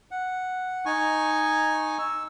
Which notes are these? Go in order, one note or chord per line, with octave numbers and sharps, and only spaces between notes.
F#5
D#4 G#5 C#6
E6